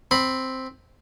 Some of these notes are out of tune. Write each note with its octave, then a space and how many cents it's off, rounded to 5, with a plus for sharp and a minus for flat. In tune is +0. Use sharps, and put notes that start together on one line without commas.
C4 +0 B5 +0